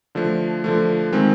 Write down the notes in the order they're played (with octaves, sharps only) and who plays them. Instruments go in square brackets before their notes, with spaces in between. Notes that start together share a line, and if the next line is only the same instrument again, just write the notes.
[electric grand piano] D3 F3 A3
D3 F3 A3
D#3 G#3 C4